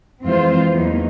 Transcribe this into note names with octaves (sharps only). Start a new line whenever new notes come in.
F2 E3 G#3 C4 F4 C5
E2 F#3 A#3 D#4